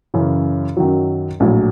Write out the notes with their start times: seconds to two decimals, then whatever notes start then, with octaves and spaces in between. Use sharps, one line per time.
0.14 F#2 C#3 E3
0.77 F#2 D#3 F#3
1.40 A#1 A2 F#3